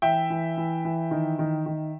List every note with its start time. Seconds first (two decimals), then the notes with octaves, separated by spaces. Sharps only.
0.02 E3 E5 G5
0.30 E3
0.58 E3
0.85 E3
1.11 D#3
1.39 D#3
1.66 D#3